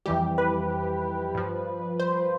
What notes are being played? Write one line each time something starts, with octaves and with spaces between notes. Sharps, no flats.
F2 E3 G3 G4
B4
G2 F3
C5